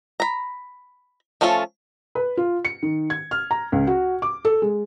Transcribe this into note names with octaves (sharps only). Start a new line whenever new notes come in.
A#5 B5
F3 A3 C#4 F4 A4
B4
F4
C#7
D#3
G#6
F6
A#5
C#2
F#4
D6
A4
G#3